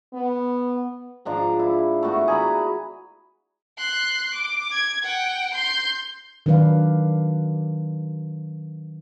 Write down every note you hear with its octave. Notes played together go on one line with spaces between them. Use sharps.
B3
G#2 F3 D4 A#5
E4
A3 B3 F#4
G#4 A#5 B5
C6 F#6
D6
G#6
F#5 G5
C6 G6
D#3 F#3 D4 B4 D5 F5